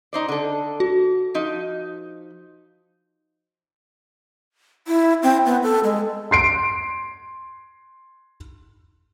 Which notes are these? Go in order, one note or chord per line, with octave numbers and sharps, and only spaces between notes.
D#4 C5 D5
D3 A4
F#4
F3 D#4
E4
C4
B3
A4
G#3
C6 C7 D7